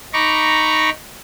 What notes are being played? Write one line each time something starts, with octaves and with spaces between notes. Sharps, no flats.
D#4 A#5 B5 C#6 D6